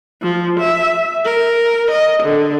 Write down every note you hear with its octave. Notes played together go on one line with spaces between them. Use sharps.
F3
E5
A#4
D#5
D3